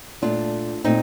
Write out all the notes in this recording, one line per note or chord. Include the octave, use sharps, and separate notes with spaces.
A#2 A3 D4 F4
A#2 A3 C4 D#4